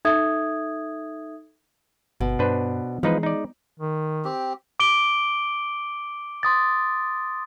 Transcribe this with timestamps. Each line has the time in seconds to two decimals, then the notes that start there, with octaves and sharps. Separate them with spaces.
0.05 D#4 A4 E5 D#6 G#6
2.20 G1 B2
2.39 G2 D4 B4 C5
3.03 E3 F3 G#3 D#4 B4
3.23 D#4 D5
3.80 D#3
4.25 C4 G4
4.80 D6 D7 G7
6.43 C6 D#6 A6